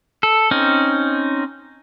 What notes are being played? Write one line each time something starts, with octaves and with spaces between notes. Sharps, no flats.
A4
C4 C#4 D#4